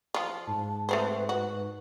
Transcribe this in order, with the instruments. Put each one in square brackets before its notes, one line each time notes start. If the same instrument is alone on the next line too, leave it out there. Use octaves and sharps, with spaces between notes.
[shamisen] F3 F4
[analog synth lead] G#2 [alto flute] A5
[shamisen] A3 C4 C5 [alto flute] B4
[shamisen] F#4 [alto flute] B4